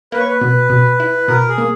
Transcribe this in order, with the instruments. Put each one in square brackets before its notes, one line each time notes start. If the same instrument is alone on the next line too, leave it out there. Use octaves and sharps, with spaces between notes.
[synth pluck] A#3 [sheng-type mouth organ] B4
[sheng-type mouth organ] C#5
B4
[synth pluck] B2
B2
E4
[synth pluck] B2 [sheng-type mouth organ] A#4
[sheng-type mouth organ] G#4
[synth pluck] A#3